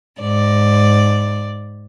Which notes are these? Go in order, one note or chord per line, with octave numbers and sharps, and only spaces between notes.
G#2 D5